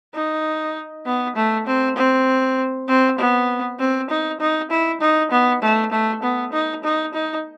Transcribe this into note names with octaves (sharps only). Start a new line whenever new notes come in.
D#4
B3
A3
C4
C4
C4
B3
C4
D#4
D#4
E4
D#4
B3
A3
A3
B3
D#4
D#4
D#4